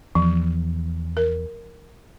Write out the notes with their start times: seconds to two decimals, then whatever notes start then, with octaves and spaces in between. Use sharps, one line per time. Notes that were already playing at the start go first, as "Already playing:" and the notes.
0.15 E2 F3
1.17 A#4